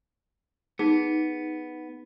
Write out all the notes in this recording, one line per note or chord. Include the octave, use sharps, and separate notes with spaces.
B3 D#4 G#4